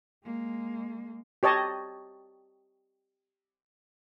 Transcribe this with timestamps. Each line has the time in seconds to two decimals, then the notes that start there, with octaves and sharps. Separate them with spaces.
0.24 G#3 A#3
1.43 G4 C#5 D#5 A5